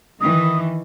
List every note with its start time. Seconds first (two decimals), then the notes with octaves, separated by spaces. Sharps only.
0.21 D#3 E3 D#6